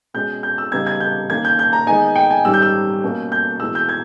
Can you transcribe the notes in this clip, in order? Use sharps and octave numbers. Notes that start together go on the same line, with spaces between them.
B2 G#3 C#4 G6
G6
E6
C#3 G3 B3 D#4 G#6
G#6
G6
D#3 A#3 C#4 G#6
G6
G6
A#5
D#3 G#3 B3 D#4 G#5
G5
G#5
G#2 D#3 G3 C#4 E6
G6
E6
B2 A#3 C#4
G6
E2 B2 G#3 E6
G6
G#6